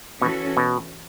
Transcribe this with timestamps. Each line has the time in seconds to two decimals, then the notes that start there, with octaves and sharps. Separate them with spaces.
0.22 B2 E3 C#4 F#4 A4
0.57 B2